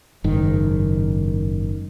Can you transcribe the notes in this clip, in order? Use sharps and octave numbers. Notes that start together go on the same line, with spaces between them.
F#1 G#2 D#3